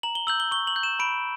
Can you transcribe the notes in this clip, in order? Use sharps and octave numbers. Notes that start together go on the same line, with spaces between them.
A#5 F#7
G7
E6 G6 F#7
G7
C#6 G7
F#7
G6
E7
B5 D7